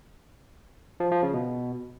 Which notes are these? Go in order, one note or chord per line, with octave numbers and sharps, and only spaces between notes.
F3
F3
C#3
B2